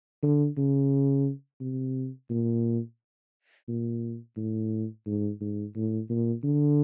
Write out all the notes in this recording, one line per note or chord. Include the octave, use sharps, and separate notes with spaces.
D3
C#3
C3
A#2
A#2
A2
G#2
G#2
A2
A#2
D3